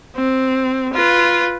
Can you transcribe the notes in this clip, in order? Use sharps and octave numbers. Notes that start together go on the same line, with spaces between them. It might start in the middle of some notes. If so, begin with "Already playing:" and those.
C4
F4 B4